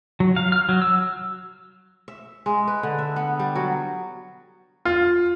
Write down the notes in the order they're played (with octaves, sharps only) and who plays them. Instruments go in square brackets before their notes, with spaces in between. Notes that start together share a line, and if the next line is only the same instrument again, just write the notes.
[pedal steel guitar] F#3
F5
F6
F#3
E6
[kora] E5
G#3
B4
D3
E5
B3
G3
F#3
[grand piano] F4